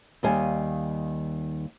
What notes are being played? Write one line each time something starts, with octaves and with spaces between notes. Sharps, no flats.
D#2 D#3 G3 F5 G#5